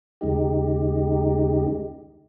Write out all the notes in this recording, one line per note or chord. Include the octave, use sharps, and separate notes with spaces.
D#2 C#3 G#3 D#4 G4